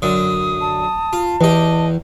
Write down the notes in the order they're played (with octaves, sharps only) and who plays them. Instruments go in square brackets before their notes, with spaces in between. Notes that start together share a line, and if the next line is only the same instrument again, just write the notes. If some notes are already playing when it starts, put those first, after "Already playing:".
[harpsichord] F#2 D3 [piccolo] D#6
[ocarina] A5
[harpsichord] F4
[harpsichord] E2 G4 [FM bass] E3 [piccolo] D#5